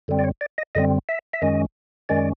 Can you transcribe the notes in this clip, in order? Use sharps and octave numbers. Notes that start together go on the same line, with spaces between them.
F#2 D3 G3 C4
D5
C#5
D5
D#5
F#2 D3 G3 C4 D#5
E5
E5
F#2 D#3 G#3 C#4 D#5
F#2 D#3 G#3 C#4 D5